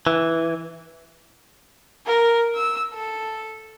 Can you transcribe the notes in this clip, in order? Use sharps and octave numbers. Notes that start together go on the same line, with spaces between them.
E3
A#4
E6
A4